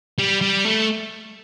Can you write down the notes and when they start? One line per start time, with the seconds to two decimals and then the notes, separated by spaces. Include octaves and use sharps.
0.18 G3
0.41 G3
0.65 A3